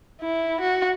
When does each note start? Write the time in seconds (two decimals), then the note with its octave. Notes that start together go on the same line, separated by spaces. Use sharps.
0.21 E4
0.61 F#4